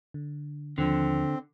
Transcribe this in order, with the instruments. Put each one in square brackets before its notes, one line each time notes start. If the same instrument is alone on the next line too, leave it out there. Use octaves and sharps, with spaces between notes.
[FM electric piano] D3
[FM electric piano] D#2 F3 [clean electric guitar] D3 [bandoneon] C4